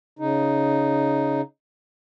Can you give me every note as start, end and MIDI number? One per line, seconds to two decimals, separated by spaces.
0.19 1.41 49
0.19 1.41 63